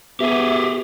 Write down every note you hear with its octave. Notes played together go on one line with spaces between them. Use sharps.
B3 G4 G#4 E5